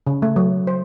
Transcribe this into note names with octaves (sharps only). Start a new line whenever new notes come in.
C#3
A3
F#3
C5